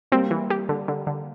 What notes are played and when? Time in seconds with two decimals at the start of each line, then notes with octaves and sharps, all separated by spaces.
0.12 G3 A#3 C4
0.31 E3
0.50 G4
0.69 D3
0.88 D3
1.07 D3